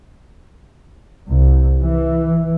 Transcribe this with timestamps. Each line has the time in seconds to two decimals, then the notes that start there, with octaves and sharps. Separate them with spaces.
1.30 C2
1.79 E3